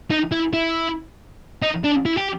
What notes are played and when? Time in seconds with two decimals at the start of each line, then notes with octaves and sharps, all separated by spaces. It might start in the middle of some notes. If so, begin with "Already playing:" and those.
0.10 D#4
0.32 E4
0.54 E4
1.62 D#4
1.84 D4
2.06 E4
2.17 G4